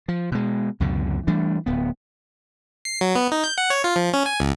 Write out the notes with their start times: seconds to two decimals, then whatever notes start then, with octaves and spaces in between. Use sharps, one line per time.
0.08 F3
0.32 B2 G#3
0.80 C#2 F#2 B2 D3
1.27 E3 G3 A3 D4
1.66 D1 B3
2.85 C7
3.01 F#3
3.16 B3
3.32 D#4
3.44 G6
3.58 F#5
3.70 C#5
3.84 F4
3.96 F3
4.13 C#4
4.26 G#5
4.40 C#2